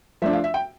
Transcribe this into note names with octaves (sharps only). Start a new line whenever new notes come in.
F3 A3 D4 E5
F5
E5
G5